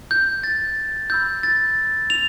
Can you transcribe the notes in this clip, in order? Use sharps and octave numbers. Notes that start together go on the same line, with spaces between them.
G6
A6
B5 E6 G6
A6
F7